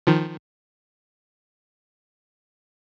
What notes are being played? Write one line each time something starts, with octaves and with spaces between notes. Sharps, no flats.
D#3 F3